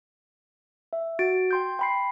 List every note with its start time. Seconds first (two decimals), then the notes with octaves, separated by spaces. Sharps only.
0.93 E5
1.19 F#4 A6 D7
1.51 G5 C6 G6
1.79 G5 B5 C7